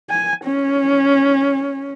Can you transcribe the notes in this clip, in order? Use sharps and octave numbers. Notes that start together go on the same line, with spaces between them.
G#5
C#4